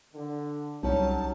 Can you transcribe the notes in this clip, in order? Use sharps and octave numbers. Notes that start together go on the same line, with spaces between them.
D3
C2 F#3 G3 C#4 D#4 A5